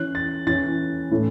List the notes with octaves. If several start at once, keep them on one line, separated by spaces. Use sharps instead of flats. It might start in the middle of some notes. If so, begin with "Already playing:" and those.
Already playing: E3 C#4 F#6
A6
E3 C#4 A6
A2 E3 A3 C#4